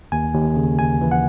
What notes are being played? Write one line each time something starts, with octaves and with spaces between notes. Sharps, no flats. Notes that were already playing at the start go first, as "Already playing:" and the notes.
D#2 G#5
D#2
C#3
D#2 G#5
E3
F#5